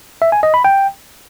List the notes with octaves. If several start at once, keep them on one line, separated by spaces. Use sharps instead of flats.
E5
G#5
D#5
B5
G5